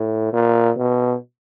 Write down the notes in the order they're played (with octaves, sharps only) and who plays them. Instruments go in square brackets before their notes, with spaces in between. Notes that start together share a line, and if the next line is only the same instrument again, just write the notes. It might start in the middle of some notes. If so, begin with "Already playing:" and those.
Already playing: [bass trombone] A2
A#2
B2